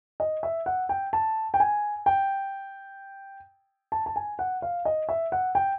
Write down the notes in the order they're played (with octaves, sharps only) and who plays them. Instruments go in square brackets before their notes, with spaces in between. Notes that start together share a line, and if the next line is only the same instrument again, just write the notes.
[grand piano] D#5
E5
F#5
G5
A5
G5
G#5
G5
A5
A5
G#5
F#5
F5
D#5
E5
F#5
G5